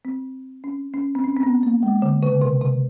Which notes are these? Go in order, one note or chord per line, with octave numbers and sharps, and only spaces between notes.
C4
C#4
C#4
C4
C#4
C4
B3
A#3
G#3
D3
C#3
C3
C3